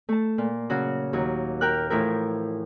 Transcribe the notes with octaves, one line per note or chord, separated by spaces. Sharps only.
A3 A5
A#2
C#3 F#3 F#4
D#2 F#3
A#4 G5 F6 F#6
A2 E3 F3 E4 A#4